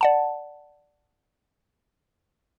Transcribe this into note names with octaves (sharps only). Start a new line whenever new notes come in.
D5 F#5 A5